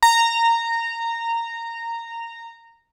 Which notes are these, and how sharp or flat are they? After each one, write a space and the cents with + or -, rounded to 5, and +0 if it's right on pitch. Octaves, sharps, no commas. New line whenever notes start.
A#5 -15